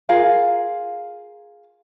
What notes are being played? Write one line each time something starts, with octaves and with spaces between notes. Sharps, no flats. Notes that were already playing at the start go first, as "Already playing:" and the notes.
F4 G#4 A#4 F5